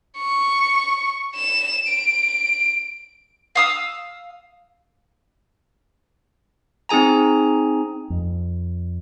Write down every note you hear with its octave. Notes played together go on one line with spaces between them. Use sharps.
C#6
E7
D7
F5 D#6 E6
C4 D#4 G#4 G#5 A#5
F2